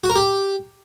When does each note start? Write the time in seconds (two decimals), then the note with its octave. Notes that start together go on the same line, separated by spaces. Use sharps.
0.04 F#4
0.10 A#4
0.16 G4